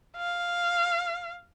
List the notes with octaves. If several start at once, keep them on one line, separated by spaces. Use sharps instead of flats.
F5